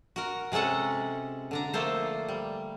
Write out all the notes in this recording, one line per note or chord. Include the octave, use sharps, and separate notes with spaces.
F#4 A#4
C3 G#3 C#4 A4 F#5
D3 D4 A#5
F3 A3 A#3 A4 C5
G3